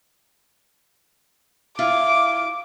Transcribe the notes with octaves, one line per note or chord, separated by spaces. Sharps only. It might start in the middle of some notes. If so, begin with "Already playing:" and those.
E4 F4 F5 D6